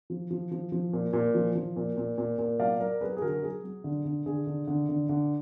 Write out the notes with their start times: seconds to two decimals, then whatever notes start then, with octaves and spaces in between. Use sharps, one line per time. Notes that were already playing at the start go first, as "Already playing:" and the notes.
0.10 F3
0.31 F3
0.51 F3
0.72 F3
0.93 A#2
1.13 A#2
1.35 F3
1.55 F3
1.76 A#2
1.97 A#2
2.18 A#2
2.38 A#2
2.59 F#3 D5 F5
2.80 F#3 A#4 D5
3.01 F#3 G#4 B4
3.17 G#4
3.21 D3 F#4 A#4
3.42 F#3 G#4
3.64 F#3
3.84 D3
4.05 D3
4.26 D3 G#4
4.47 D3
4.67 D3
4.89 D3
5.09 D3